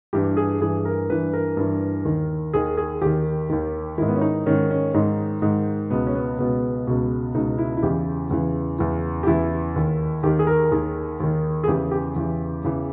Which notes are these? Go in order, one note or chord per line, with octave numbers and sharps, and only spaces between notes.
G2 E3 G4
G#4
G2 E3 G#4
A#4
G2 E3 B4
A#4
G2 E3
D#2 D#3
D#2 D#3 G#4
G#4
D#2 D#3 G4
D#2 D#3
G#2 D#3 E4
B3
C#4
D#4
G#2 D#3 C#4
C#4
G#2 D#3 D#4
G#2 D#3
C#2 B2 B3
C#4
B3
C#2 B2 B3
C#2 B2
C#2 B2 D#4
E4
E4
E2 C#3 E3 G4
E2 C#3 E3
E2 C#3 E3
G4
E2 C#3 E3 E4
D#2 D#3
D#2 D#3 G4
G#4
A#4
D#2 D#3 G#4
D#2 D#3
G#4
E2 C#3 E3 G4
G4
E2 C#3 E3
E2 C#3 E3